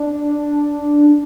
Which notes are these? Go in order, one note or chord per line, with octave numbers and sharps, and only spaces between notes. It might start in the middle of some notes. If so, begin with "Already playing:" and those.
Already playing: D4